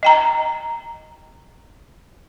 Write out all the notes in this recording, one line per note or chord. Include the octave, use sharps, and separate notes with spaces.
D#5 G5 A#5